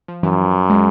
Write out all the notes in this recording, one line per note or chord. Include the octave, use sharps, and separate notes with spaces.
F3
F#2 E3
G#3